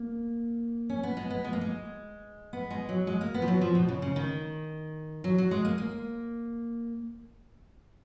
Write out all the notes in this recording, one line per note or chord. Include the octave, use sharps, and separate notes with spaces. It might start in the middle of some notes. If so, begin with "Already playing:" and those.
Already playing: A#3
C#4
B3
G#3
B3
G#3
A#3
G#3
B3
G#3
F#3
G#3
A#3
B3
F3
F#3
F3
B2
C#3
C#3
D#3
F#3
F#3
G#3
A#3
A#3